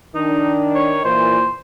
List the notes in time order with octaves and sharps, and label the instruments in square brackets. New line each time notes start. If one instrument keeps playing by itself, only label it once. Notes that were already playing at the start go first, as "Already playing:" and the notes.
[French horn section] D#3 D4 [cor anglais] D#4
[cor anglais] C#5
[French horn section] A#2 E3 [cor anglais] C5